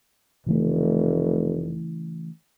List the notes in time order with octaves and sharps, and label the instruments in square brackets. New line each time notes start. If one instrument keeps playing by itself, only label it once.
[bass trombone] F1 [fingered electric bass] C#3 E3 A3